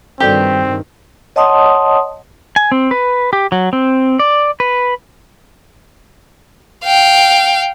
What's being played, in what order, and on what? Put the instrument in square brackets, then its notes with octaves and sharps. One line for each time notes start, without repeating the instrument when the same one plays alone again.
[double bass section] G2 D#3 [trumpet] C4 [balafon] F#4 A4 D5 [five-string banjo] G4
[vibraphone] C#5 D#5 F#5 A5 C6 D#6
[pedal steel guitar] G#5
C4
B4
G4
F#3
C4
D5
B4
[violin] F5 G5